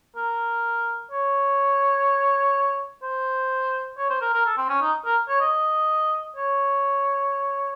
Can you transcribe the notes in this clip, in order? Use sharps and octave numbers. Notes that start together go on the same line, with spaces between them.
A#4
C#5
C5
C#5
C5
A#4
A#4
A4
C4
C#4
D#4
A#4
C#5
D#5
C#5